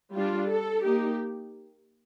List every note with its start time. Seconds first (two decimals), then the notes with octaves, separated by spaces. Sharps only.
0.15 G3 D4 F4
0.50 A4
0.84 A#3 D#4 G4